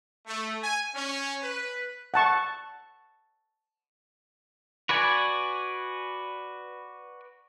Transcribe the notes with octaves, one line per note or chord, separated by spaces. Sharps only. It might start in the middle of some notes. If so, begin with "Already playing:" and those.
A3
G#5
C#4
B4
F#5 A5 C#6
F#4 B4 D5 G#5